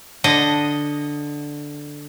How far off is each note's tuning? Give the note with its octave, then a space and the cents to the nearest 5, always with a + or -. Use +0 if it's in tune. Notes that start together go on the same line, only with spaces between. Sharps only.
D3 +0 D#5 +0